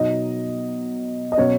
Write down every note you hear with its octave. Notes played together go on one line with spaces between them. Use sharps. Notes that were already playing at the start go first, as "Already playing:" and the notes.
Already playing: B2 F#3 B3 D#4 D#5
D#5
B2 F#3 C#4 C#5